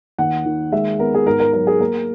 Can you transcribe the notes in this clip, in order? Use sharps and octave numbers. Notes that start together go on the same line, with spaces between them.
D#2 F#5
D#3
G#3 E5
B3 A#4
G#4
G#2 A#4
A#4
F#3 A#4
G#4
A#3 A#4